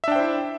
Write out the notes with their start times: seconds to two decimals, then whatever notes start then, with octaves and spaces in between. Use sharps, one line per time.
0.04 E5
0.08 D4
0.12 G5
0.16 C5
0.20 E4